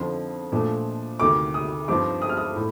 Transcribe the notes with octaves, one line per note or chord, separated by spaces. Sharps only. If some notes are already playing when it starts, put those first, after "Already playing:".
Already playing: F2 D3 F3 C4 D#4 C6
A#2 F3 A3 D4
D2 C3 D#3 D6
D#6
G2 F3 C4 D#4 D6
D#6
F6
D#6
A2